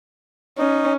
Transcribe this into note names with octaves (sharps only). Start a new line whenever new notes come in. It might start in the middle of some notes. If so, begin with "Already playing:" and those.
C#4 D#4